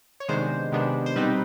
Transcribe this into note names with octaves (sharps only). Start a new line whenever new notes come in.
C#5
C3 D#3 G#3 B3 D4 C5
C3 D#3 G#3 B3 D4
C5
B2 G3 C4 D#4 B4